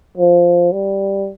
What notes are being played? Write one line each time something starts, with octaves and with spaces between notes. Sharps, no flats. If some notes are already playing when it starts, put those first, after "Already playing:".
F3
G3